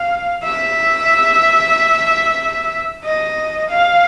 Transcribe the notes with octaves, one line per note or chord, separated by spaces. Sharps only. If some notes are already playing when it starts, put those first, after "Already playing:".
Already playing: F5
E5
D#5
F5